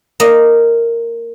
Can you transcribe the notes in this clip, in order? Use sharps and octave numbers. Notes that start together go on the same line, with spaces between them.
A#3 D#5